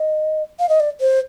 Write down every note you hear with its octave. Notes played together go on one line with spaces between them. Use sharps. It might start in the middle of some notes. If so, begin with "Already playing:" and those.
Already playing: D#5
F5
D#5
D5
C5